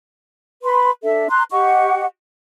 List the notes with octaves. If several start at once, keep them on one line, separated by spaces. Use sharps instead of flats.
B4 B5 C6
D4 A4 E5
A#5 C6 F#6
G4 D#5 F#5 C#6